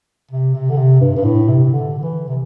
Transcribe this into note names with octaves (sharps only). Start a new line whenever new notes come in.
C3
C3
D3
C3
G2
G2
A2
C3
C3
D3
D3
E3
C3